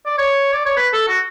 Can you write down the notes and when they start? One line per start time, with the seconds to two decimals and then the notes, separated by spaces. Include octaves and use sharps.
0.06 D5
0.18 C#5
0.53 D5
0.66 C#5
0.77 B4
0.93 A4
1.08 F#4